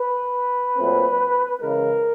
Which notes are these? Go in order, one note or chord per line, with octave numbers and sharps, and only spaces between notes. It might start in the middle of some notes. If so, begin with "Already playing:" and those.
Already playing: B4
A#2 F#3 A3 C4
C#3 E3 G#3 A#4